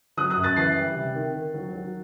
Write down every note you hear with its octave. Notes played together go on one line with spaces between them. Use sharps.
F#3 D#6 F#6
D#6 F#6
F#2
F#6 A6
E3 A6 C7
G3
C3
D#3
D#3
F#3
F#3